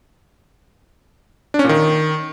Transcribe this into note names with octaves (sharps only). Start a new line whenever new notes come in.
D4
C#4
A#2
D#3